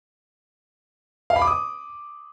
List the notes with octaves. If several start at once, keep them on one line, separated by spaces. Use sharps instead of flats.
F5
B5
D6
D#6